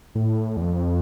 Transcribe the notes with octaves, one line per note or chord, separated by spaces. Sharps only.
A2
E2
F2